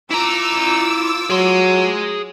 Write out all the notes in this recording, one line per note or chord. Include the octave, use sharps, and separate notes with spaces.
E4 F4 A#5 D6 E6
F#3 G#4 C6